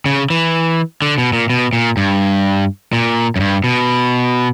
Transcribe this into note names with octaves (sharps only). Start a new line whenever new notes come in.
C#3
E3
D3
B2
A#2
B2
A#2
G2
A#2
F#2
G2
B2